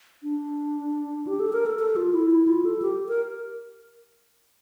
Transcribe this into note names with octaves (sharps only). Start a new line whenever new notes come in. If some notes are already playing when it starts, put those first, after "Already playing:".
D4
G4
A4
A#4
A4
A4
F4
E4
E4
F4
A4
G4
A#4